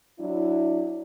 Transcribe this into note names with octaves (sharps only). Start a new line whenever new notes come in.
F#3 D4 E4